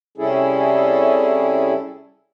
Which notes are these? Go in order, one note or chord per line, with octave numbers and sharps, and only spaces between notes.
C3 G3 C#4 E4 G#4 A4